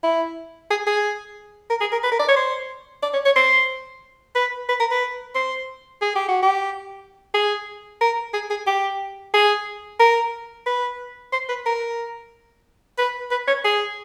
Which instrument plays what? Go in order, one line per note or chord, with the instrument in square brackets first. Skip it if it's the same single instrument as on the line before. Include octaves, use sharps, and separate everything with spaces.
[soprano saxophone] E4
G#4
G#4
A#4
G#4
A#4
B4
A#4
D5
C#5
C5
D5
C#5
C#5
C5
B4
B4
A#4
B4
C5
G#4
G4
F#4
G4
G#4
A#4
G#4
G#4
G4
G#4
A#4
B4
C5
B4
A#4
B4
B4
C#5
G#4